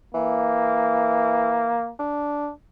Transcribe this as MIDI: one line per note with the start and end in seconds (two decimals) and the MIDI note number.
0.14 1.79 52
0.14 1.93 58
1.99 2.50 62